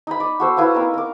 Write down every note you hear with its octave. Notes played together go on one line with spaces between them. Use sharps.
D#4 B5
D5
F#4 A4 C5
E4 B4 F5 F#5
C4 D#4 A#4
A#4 D6